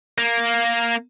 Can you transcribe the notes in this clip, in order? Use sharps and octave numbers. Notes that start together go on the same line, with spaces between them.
A#3